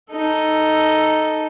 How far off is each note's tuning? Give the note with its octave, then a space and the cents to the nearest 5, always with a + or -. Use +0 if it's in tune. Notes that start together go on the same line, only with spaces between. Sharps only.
D#4 +0 A4 +0